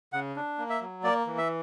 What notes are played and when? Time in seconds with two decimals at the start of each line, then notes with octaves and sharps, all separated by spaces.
0.13 C#3 F#5
0.36 D4
0.58 A#3
0.70 E5
0.81 F#3
1.04 A#3 D5
1.27 E3
1.38 E5